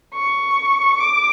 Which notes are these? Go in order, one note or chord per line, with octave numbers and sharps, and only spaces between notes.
C#6
D6